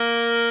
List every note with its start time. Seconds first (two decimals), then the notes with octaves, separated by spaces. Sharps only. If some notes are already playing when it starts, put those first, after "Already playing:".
Already playing: A#3